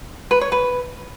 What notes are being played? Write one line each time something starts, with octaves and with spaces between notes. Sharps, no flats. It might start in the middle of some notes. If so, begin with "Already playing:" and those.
B4
C#5
B4